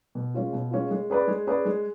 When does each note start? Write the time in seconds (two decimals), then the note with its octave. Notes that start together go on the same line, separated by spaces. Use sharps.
0.15 B2
0.34 G#3 C#4 F4
0.53 B2
0.71 G#3 C#4 F4
0.91 G#3
1.10 C#4 G#4 B4 D5
1.28 G#3
1.47 C#4 G#4 B4 D5
1.65 G#3